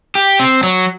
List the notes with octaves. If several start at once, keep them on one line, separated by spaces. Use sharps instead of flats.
G4
C4
F#3